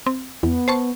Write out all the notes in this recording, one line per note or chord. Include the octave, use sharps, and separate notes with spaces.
C4
E2 B3
C5 A5 C#6